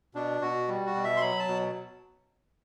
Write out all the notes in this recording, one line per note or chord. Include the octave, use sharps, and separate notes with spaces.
B2 D4
B2 F#4
G3
F#4
B2
E5
C6
F#3 B5
A5
B2